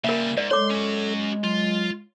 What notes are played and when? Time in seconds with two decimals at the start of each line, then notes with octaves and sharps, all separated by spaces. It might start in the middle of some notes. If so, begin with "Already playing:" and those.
0.04 C#3 G3 A#3 A#4 E5
0.37 G#2 D5
0.51 G#3 A4 C#5 C6 D6
0.71 C#4 F#4
1.44 F#3 F4